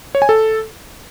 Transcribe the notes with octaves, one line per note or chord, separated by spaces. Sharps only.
C#5
G#5
A4